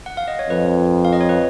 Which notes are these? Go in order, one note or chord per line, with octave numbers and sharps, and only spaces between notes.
F#5
F5
D#5
C#5
F2 B4
F5
D#5
C#5
B4